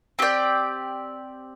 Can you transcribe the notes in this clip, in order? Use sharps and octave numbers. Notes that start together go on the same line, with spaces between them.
C4 G4 D5 G5